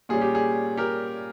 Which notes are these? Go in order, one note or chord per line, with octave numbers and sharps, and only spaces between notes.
A#2 G3 C#4 G#4
G4
G#4
G4 A#4